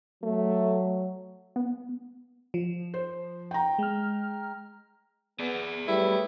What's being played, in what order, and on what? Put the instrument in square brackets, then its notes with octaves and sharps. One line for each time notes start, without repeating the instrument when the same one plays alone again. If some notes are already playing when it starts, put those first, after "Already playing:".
[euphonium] F#3 [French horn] A3
[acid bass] B3
[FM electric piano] F3
[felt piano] C5
G5 A#5
[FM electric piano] G#3 F6
[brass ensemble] B3 [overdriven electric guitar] G#4 D5
[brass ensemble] F#3 A3 B4 [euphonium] G3 [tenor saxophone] E4